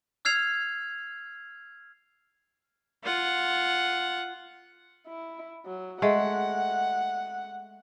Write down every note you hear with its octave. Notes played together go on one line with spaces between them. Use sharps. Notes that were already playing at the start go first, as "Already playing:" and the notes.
E6 F6 G#6 C7 F7
F4 F#5
E4
F#3
G#3 A3 F#5